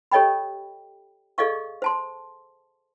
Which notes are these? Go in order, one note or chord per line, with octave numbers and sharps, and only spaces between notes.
G4 A4 C#5 D#5 G5 B5
G#4 A4 D5 D#5 F5 C#6
C5 A5 C6